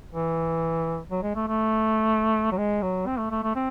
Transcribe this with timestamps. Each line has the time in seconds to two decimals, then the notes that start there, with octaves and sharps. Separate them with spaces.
0.13 E3
1.11 F#3
1.22 G#3
1.35 A3
1.48 A3
2.52 F#3
2.57 G#3
2.82 F#3
3.07 C4
3.18 A3
3.31 A3
3.43 A3
3.55 C4